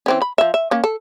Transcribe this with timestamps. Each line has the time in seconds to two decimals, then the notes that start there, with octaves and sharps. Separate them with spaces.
0.06 E3 C4 C#4
0.22 B5
0.38 F3 E5
0.54 E5
0.71 A#3 C#4
0.84 A4